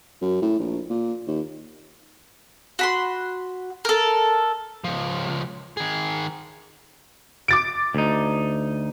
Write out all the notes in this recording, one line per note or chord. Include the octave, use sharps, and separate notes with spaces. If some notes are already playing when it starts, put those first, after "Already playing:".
F#2
A2
A#1
A#2
D#2
F#4 B5 C6
A4 A#4
C#2 F3
D#3 G#4
D6 A6 D7
D2 D#4